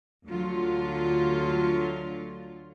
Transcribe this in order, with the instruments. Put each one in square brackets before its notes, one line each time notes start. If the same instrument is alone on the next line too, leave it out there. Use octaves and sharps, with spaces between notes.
[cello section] D2 D3 F#3 F4